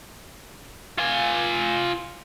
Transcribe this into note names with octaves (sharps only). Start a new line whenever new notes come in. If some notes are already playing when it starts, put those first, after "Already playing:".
F4 G#5